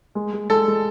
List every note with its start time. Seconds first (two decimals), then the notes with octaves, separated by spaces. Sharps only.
0.15 G#3
0.33 G#3
0.50 G#3 A4
0.67 G#3